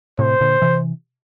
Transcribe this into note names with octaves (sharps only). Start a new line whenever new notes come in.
A2 C3 C5
A#2 D3
C3 E3